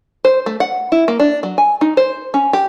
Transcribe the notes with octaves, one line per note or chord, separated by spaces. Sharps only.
C5
A3
F#5
E4
A#3
D4
F#3
G#5
D#4
C5
C#4
G4